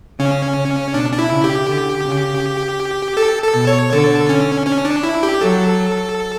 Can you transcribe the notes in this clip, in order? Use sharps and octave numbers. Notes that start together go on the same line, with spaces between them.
C#3 C#4
C#3
B2 D4
D4
E4
C#3
G4
D3
C#3
A4
A4
B2
C#5
D3 A4
C#4
C#4
D4
E4
G4
F#3 A4